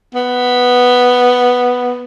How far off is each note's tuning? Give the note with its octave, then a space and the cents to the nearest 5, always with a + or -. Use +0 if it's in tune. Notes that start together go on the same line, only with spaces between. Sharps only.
B3 +0